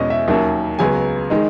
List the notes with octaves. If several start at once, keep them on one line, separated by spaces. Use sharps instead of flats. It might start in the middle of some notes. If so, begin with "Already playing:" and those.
Already playing: E2 B2 G#3 C#4 D#5
E5
D#2 D#3 F#3 A#3 C#4 E5
C#2 C#3 F#3 B3 G#5
D#3 G#3 D#4